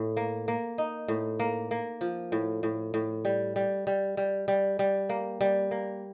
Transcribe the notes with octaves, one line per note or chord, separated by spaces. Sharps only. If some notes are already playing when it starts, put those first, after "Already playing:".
Already playing: A2
A#3
A#3
D#4
A2
A#3
A#3
F3
A2
A2
A2
G3
G3
G3
G3
G3
G3
A#3
G3
A#3